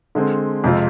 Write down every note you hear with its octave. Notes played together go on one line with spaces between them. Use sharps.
D3 G#3 C4
F2 C3 G#3 C4 F4